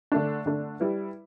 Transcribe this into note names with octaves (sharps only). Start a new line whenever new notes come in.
D3 A3 D4
D3 A3 D4
G3 E4 B4